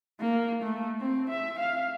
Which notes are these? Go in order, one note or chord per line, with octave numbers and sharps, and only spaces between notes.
A#3
A3
C4
E5
F5